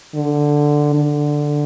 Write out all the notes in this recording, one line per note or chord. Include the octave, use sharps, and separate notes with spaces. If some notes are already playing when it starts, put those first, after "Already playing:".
D3
D3